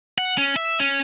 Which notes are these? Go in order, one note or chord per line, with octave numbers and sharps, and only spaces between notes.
F#5
C#4
E5
C#4